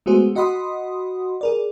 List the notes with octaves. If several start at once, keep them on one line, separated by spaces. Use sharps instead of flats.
G#3 A3 B3 F#4 G#4 C5
F#4 D#5 F#5 B5 C6 D#6
G#4 A#4 D5